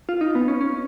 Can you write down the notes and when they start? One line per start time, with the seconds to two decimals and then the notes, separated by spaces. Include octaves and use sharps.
0.09 F4
0.21 D#4
0.35 B3
0.48 C#4
0.61 C#4